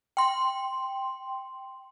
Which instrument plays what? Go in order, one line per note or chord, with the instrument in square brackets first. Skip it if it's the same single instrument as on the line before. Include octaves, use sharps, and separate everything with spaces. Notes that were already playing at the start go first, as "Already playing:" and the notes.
[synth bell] G5 C6